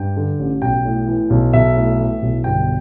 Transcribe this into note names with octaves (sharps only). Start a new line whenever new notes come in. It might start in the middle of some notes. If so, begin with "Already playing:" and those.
Already playing: G2 G5
D3
A1
B1 G5
A2
E3
B1
B1 E5
A2
E3
B1
G1 G5